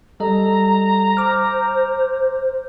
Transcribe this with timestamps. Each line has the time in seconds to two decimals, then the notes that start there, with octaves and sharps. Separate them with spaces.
0.20 G3 A4 D#5 A#5
1.17 C5 D6 F6